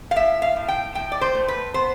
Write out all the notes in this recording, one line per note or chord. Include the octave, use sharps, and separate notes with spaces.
F5
A2 E5
F5
A2
G5
A2 G5
D5
C5
A3
B4
B3 C5